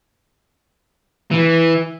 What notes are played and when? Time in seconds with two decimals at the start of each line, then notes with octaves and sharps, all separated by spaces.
1.31 E3